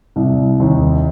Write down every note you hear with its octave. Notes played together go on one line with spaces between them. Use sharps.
C2
D#2